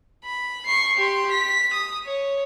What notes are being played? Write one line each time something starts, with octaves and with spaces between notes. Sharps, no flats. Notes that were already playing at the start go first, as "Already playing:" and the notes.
B5
C#6 C7
G4 C6
B6
D#6
C#5